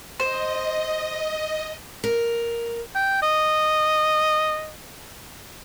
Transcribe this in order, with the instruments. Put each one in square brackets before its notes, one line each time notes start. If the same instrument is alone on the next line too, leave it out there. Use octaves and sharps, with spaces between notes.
[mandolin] C5 [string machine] D#5
[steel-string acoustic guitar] A#4
[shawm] G5
D#5